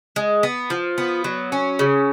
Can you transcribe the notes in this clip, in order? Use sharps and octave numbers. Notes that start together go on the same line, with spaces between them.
G#3
B3
F3
B3
F#3
C#4
C#3